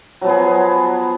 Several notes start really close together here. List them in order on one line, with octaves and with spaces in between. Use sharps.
F#3 F3 B3 G#4